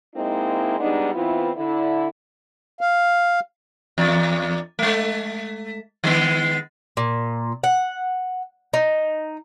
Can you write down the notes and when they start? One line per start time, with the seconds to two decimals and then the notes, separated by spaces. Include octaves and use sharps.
0.16 G#3 A#3 C4 D#4 E4
0.80 G3 G#3 B3 D4 D#4
1.14 E3 B3 C4 E4 F4
1.57 D3 E4
2.81 F5
3.98 E2 D5
4.79 G#3 A3
6.04 D#3 G#3 B3
6.97 A#2
7.64 F#5
8.74 D#4